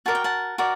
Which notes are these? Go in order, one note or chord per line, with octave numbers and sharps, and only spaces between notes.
F#4 A#4 D5 A5
G5
F#5 A5
F#4 A#4 D5